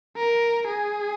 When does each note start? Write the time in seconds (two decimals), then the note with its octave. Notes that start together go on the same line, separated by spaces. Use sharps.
0.17 A#4
0.67 G#4